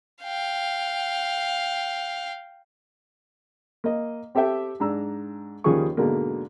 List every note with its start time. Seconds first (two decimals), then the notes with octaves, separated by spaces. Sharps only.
0.23 F5 G5
3.84 A#3 D#5
4.35 C4 G4 A4 E5 G5
4.80 G#2 D4 A#5 E6
5.64 D#2 C#3 F3 G3 G#4 C#6
5.97 G#2 B2 D3 G#3 A#3